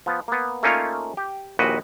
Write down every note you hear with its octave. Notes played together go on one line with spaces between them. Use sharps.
F3 B3
A#3 B3
A3 A#3 C#4 D#4 F4 C#5
G4
A#1 D#2 A#2 F#4 B4 D#5